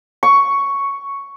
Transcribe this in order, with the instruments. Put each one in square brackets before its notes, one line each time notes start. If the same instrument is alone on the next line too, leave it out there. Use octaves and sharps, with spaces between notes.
[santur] C#6